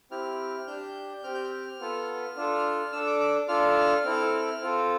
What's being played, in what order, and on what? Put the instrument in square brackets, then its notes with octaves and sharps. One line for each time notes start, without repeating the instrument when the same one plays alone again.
[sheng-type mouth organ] C4 E4 G4 F6
D4 G4 G6
C4 G4 F6
G6
F6
B3 F4 A4
D4 F4 A4
D4 A4 E6
D6
D6
D4 F4 A4 F6
C4 E4 A4
C4 F4 A4